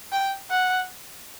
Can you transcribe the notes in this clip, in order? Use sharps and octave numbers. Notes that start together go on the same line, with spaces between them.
G5
F#5